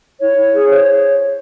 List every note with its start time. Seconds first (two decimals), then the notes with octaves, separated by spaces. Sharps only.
0.20 E4 C#5
0.37 E4
0.53 G#4
0.69 C5 C#5